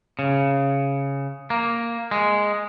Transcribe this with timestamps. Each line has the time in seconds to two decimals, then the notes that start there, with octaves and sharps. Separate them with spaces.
0.19 C#3
1.50 A#3
2.11 G#3